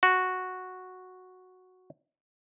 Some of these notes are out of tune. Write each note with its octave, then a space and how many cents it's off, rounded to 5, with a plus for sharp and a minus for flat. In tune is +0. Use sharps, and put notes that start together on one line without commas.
F#4 -5